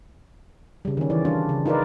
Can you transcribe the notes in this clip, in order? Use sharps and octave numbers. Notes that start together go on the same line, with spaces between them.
C#3 G3
D#3 C#4
E3 D5
G3 D4 F4
C#3
D#4 F4 A#4 B4 D5